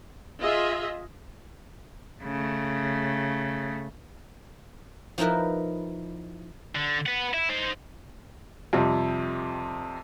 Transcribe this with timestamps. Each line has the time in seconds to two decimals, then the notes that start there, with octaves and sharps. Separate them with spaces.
0.42 F4 G#4 D#5 E5
2.23 C#3 A3
5.18 F3 D#4 E4 A#4 B4
6.75 D3
7.06 B4 F#5
7.34 E4
7.50 D#4 C5
8.73 F2 C3 G3